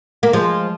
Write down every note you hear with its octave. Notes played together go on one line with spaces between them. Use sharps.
A#3
F3 G#3